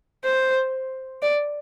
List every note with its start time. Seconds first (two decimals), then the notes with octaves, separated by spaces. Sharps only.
0.25 C5
1.23 D5